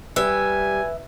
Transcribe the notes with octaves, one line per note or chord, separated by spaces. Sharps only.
G3 B4 E5 G#5